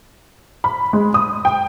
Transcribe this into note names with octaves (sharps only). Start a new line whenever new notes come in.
B5
G#3
D#6
G5